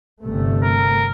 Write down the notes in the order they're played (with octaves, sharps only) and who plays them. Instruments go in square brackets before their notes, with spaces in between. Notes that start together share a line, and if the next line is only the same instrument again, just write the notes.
[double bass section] G1 C3 A3
[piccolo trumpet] A#4